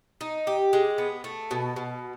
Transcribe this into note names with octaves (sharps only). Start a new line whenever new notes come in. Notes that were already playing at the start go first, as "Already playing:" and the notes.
D#4
G4
G#3
B3
A3
B2
B2